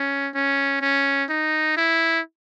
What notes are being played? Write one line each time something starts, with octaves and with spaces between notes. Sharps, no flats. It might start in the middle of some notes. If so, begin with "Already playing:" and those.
Already playing: C#4
C#4
C#4
D#4
E4